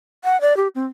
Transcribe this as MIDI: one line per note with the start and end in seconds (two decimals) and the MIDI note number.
0.24 0.40 78
0.41 0.56 74
0.57 0.68 67
0.75 0.86 60